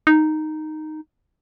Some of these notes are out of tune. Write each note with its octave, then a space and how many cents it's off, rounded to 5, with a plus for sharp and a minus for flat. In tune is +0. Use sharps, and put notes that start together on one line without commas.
D#4 -5